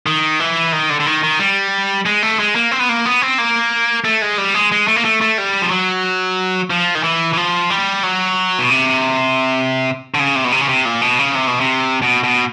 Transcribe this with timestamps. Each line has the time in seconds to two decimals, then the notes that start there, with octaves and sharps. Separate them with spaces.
0.06 D#3
0.40 E3
0.73 D#3
0.90 D3
1.00 D3
1.06 D#3
1.23 D#3
1.39 G3
2.06 G#3
2.23 A3
2.39 G#3
2.55 A#3
2.71 C4
2.79 B3
2.89 A#3
3.06 B3
3.22 C4
3.38 A#3
4.05 A3
4.22 G#3
4.38 G3
4.54 G#3
4.72 G#3
4.88 A3
4.96 A#3
5.05 A3
5.21 A3
5.38 G3
5.62 F3
5.71 F#3
6.70 F3
6.95 D#3
7.03 E3
7.33 E3
7.37 F3
7.70 G3
8.03 F#3
8.59 B2
8.70 C3
10.14 D3
10.19 C#3
10.35 C3
10.44 B2
10.52 C3
10.61 C#3
10.69 C3
10.85 A#2
11.01 B2
11.19 C#3
11.35 C3
11.47 B2
11.60 C3
12.02 B2
12.24 B2